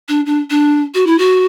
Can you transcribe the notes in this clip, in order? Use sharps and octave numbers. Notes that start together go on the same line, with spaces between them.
D4
D4
D4
F#4
E4
F#4